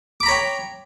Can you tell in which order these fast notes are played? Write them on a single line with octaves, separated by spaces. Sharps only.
D6 B5 A#5 C#5 G5